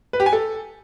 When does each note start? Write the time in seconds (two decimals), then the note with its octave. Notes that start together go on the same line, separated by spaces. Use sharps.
0.13 B4
0.20 G4
0.26 G#5
0.33 A4